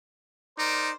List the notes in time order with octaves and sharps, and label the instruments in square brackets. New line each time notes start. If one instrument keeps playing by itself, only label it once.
[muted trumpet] D#4 [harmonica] A#4 C5 D5